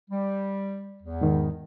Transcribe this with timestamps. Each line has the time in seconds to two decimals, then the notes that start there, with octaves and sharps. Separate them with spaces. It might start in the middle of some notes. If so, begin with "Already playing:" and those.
0.10 G3
1.02 E2
1.21 G#2 D#3